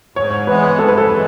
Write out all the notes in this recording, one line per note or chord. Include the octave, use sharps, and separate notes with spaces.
G#2 C#5
E3 G#3 B3 B4
G#2 A4
B4
A4
E3 G#3